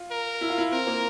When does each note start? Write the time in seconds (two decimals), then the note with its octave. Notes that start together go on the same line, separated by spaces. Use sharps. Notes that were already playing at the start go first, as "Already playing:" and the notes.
Already playing: F4
0.11 A#4
0.41 E4
0.50 F4
0.58 E4
0.72 C4 A#4
0.87 A#3